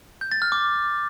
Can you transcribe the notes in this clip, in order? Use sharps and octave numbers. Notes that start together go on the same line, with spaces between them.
G6
A6
F6
D6